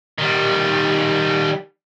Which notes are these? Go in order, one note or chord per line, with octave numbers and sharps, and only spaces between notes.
D#3 G3